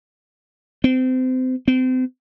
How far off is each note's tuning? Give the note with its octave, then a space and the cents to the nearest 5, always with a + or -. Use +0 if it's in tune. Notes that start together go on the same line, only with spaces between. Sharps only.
C4 -30
C4 -35